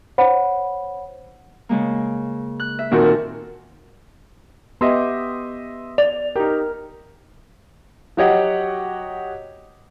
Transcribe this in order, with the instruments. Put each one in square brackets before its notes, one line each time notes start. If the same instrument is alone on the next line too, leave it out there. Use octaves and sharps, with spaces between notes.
[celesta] C5 C#5 F#5 B5
[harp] C#3 G#3 A#3
F#6
E5
[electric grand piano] A#2 D#3 F#4 [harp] C4 A4 [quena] A#4
[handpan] B3 G4 [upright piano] D#5 E5 C6
[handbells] D5 [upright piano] F7
[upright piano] D#4 G4 [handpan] A#4
[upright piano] F#3 F#4 G4 C#5 D#5 F#5